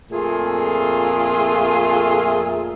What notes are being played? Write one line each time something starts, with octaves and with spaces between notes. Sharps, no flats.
F2 A#2 A3 F4 G#4